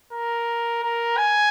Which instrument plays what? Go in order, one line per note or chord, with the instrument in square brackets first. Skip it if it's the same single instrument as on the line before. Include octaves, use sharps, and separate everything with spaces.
[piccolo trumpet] A#4
A#4
G#5